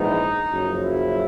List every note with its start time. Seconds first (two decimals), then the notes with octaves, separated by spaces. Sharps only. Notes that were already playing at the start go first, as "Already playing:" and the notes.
Already playing: A#1 G#2 E3 G#3 B3 D#4
0.51 F#1 F#2 C#3 F3
0.81 E4